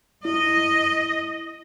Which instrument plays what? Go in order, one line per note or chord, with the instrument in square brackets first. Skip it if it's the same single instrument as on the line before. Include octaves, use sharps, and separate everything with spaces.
[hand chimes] E4 [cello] D#5